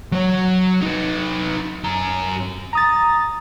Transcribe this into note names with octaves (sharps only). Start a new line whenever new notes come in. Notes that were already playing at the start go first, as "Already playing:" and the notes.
F#3 C#5
D#4 B4
F#2 A#5
A#5 D#6 A6